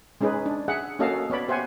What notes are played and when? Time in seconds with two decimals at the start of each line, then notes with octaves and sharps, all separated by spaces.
0.21 G#3 C#4 D#4 G#4 B4
0.46 D4
0.68 G#4 E5 F#5
0.99 A#3 C#4 F#4 A4 D#5 F5
1.30 B3 C#5 D5 B5
1.48 G4 C5 E5 F#5 G#5